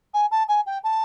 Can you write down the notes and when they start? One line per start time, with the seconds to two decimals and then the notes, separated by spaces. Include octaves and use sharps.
0.14 G#5
0.31 A5
0.48 G#5
0.66 G5
0.84 A5